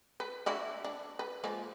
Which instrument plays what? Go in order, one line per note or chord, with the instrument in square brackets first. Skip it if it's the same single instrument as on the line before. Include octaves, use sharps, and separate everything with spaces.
[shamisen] B4
D4 E4 F#4
D4
B4
F3 G#3 A#3